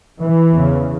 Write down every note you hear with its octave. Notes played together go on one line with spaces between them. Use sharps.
E3
E2 C#3